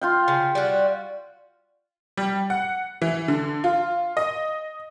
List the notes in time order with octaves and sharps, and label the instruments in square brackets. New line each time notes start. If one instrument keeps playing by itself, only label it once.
[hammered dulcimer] F4 F5 G5
[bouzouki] C#3
G3 F#4
[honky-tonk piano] G3
F#5
E3
D3
F4
D#5